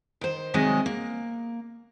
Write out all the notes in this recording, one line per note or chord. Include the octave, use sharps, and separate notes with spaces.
D#3 C5
C3 D#3 F#3 G#3 D#5 G#5
A#3